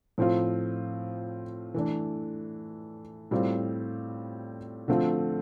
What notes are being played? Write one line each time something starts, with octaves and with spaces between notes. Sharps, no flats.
A2 F3 C4 F4
E3 A3 D4
A2 G3 C4 F4
D3 F3 A3 C4 F4